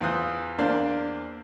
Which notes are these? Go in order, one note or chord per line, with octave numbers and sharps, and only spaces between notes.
E2 E3 F4 C5 D#6 F#6
E2 A#3 D4 C5 D5 F5